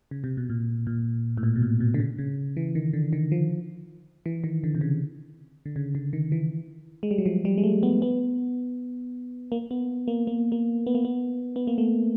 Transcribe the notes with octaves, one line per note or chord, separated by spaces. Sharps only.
C#3
C3
B2
A#2
A#2
A2
A#2
B2
A#2
B2
D3
C#3
C#3
E3
D#3
D3
D#3
F3
E3
D#3
D3
C3
C#3
D3
C#3
D3
D#3
E3
G#3
G3
F#3
F3
G3
G#3
A3
B3
B3
A#3
B3
A#3
A#3
A#3
B3
A#3
B3
B3
A#3
A3